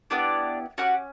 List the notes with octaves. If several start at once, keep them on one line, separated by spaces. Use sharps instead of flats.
B3 D4 E4 G4 D5
C#4 E4 F#4 G4 F#5